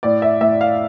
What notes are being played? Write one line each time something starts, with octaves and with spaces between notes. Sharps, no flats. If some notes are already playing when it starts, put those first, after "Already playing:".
A2 D5
E5
A2 E5
F5